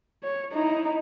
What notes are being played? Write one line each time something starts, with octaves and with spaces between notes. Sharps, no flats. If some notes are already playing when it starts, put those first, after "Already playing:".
C#5
D#4 E4